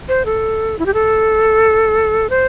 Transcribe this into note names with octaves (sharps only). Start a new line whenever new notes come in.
C5
A4
E4
G4
A4
C5